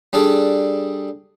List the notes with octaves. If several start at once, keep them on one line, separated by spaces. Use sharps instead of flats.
G3 D4 G#4 A4